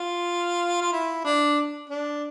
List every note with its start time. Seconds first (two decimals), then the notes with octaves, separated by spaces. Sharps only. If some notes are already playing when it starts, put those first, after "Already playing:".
Already playing: F4
0.81 F4
0.92 E4
1.25 D4
1.90 D4